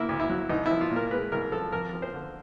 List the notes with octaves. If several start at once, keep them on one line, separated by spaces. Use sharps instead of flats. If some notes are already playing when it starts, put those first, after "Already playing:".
Already playing: D3 A#3 E4
D2
E4
F#3
C2 D#4
E4
F3
F4
A#2
A#4
G#3 B4
C2 A#4
F3 A4
F2 A#4
F3
C5
D3